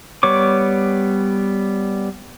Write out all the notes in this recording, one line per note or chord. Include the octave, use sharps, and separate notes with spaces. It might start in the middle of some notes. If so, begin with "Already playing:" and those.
G3 B3 C#5 D6